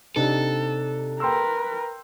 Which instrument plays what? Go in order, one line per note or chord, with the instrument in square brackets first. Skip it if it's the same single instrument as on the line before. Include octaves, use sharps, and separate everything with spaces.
[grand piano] C3 D4 D#4 [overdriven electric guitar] A4
[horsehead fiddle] A#4 B4 [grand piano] G5 C6 E6